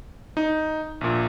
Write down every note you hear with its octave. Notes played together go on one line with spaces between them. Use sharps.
D#4
A#1 A#2